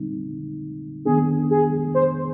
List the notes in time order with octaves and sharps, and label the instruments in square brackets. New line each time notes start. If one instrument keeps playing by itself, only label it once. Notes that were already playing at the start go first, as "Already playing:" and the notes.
Already playing: [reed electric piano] D3 G3 C4 D#4
[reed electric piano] D#3 B3 D4 [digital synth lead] G#4
[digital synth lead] G#4
C5